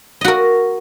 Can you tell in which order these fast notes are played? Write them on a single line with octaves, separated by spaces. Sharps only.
D#5 F#4 A#4